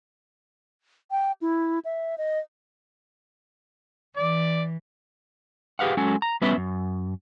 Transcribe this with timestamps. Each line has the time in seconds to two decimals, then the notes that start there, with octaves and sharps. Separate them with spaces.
1.11 G5
1.42 E4
1.85 E5
2.18 D#5
4.17 E3 D5
5.79 G4 G#4 B4 F5 F#5
5.97 F#3 G#3 C#4 A4 F#5 G#5
6.22 A#5
6.41 G3 B3 C#4 B4 E5
6.57 F#2